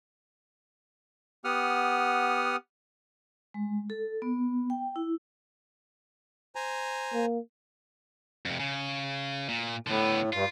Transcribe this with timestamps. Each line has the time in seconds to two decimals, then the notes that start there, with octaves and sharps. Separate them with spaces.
1.44 B3 G4 F#5 D#6 F6
3.54 G#3
3.90 A4
4.22 B3
4.70 G5
4.96 E4
6.55 C5 G#5 A#5
7.14 A#3
8.45 F2 C3
8.59 C#3
9.49 A#2
9.87 A2 D3 B3
10.33 G2 F4